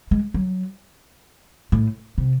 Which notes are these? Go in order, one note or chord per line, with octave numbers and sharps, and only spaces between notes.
G#3
F#3
A2
C3